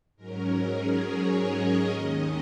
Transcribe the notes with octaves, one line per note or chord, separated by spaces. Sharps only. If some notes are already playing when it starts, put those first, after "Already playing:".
G#2 F#3 C#4 A#4
G#4
C#5
D#5
D#2 D#3 G#3 C#4 D#5